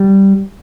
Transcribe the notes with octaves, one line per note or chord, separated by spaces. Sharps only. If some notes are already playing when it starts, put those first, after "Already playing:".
Already playing: G3